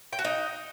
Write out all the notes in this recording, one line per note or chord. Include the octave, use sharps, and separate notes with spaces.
G5
F#4
D#4